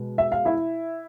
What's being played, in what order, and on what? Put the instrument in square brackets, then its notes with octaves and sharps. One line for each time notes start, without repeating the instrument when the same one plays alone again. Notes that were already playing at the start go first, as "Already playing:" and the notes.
Already playing: [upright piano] B2 G#3
E5
F5
E4 E5